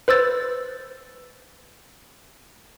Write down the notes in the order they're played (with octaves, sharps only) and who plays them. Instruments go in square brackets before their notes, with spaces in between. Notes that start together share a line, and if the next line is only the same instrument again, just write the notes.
[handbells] B4 C5 E6 A6